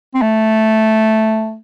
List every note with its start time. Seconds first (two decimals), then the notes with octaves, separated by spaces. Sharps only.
0.14 C4
0.22 A3